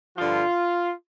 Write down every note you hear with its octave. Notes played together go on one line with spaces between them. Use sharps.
G2 D3 F3 F4